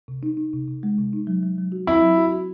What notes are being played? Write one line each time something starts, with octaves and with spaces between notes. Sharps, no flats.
C3
D#4
D#4
C3
C3
G#3
C3
D#4
F#3
F#3
F#3
F#4
C4 E4
F#3
F#4
F#4